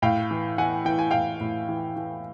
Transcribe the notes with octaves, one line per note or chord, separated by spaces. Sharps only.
A2 F5 G5
E3
E3 F#5 G#5
E3 G5
G#5
A2 F5 G5
A2
E3
E3